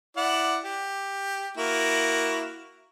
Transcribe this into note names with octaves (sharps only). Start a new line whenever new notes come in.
E4 D5 F#5
G4
A#3 E4 F#4